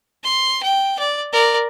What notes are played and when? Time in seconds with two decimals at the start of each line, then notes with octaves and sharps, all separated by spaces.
0.24 C6
0.63 G5
0.99 D5
1.33 A#4 D5